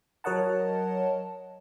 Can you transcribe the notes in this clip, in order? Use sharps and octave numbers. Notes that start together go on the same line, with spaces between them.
F#3 A#4 C#5 D#5 F#5 A5